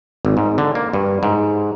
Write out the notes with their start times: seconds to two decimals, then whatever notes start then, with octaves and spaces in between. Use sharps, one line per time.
0.25 G#1
0.37 G#2
0.58 D3
0.75 A#3
0.93 G2
1.23 G#2